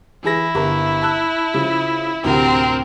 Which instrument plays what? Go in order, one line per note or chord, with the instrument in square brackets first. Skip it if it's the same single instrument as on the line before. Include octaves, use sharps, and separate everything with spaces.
[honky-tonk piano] E3 G#4 A#6 [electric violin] E4
[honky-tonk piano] G1 A#4
A5 E6 F#6
C#3 F3
[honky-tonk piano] D2 A2 C3 [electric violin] C4 A#4